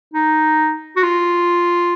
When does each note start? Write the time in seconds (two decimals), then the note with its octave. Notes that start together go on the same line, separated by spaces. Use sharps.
0.13 D#4
0.96 F#4
1.03 F4